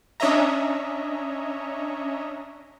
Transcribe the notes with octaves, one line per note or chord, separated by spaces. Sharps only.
C#4 D4 C#5 D#5 E5 A#5